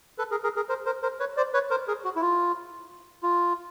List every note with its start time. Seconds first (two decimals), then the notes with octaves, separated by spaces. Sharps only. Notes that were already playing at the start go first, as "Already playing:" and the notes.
0.18 A4 B4
0.31 G#4 A#4
0.44 G#4 A#4
0.56 G#4 A#4
0.69 A#4 C5
0.86 A#4 C5
1.03 A#4 C5
1.20 B4 C#5
1.37 C5 D5
1.53 B4 C#5
1.70 A#4 C5
1.88 G#4 A#4
2.04 F#4
2.16 E4
2.22 F4
3.23 F4